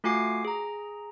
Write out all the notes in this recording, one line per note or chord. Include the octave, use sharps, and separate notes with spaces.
A3 F4 F#4 G#5 D6 C7
G#4 A#5